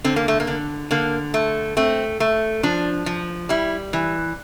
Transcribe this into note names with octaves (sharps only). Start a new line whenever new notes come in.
D3 C4
A#3
A3
A#3
D3
D3 A#3
A3
A3 C4
A3
F3 D4
F3
G3 E4
E3